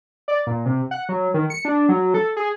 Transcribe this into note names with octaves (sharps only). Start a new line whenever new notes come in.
D5
A#2
C3
F#5
F#3
D#3
C#7
D4
F#3
A4
G#4